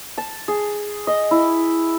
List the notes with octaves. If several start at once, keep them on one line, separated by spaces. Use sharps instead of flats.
A5
G#4
D#5
E4